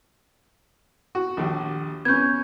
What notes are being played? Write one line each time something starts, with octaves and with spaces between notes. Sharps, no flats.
F#4
A#1 D#2
B3 C#4 G6 G#6